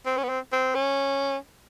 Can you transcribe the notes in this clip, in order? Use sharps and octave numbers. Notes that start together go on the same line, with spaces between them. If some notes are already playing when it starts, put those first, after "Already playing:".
C4
C#4
B3
C4
C4
C#4